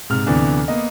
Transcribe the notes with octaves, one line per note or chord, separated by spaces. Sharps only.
G#2 C3 F6
D2 C3 E3 B3 D4
A#3 B3 D#5